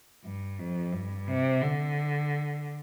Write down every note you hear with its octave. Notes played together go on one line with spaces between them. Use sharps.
G2
F2
G2
C3
D3